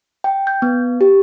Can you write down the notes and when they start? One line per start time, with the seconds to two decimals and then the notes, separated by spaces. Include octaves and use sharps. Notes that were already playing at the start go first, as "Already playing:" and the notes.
0.24 G5
0.47 G6
0.62 B3
1.01 G4